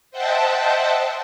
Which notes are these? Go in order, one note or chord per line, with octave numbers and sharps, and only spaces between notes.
C5 D#5 E5 F#5 G5 A5